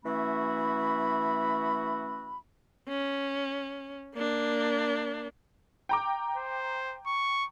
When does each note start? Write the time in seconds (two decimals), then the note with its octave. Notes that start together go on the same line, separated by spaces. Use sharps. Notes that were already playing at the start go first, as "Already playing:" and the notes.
0.05 E3 A3 C#4 F#4 E5 B5
2.88 C#4
4.15 A#3 D4
5.89 G5 A#5 D6
6.37 C5
7.07 C#6